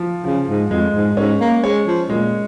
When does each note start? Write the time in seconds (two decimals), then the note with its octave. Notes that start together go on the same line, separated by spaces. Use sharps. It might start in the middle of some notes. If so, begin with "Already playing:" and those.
Already playing: F3
0.24 C#3 F3
0.48 G#2
0.71 F2 G#3
0.94 G#2
1.17 G#2 C#4
1.40 A#3
1.63 G#3 C#5
1.87 F3
2.10 A#2 G#3